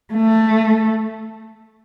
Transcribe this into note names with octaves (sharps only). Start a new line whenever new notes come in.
A3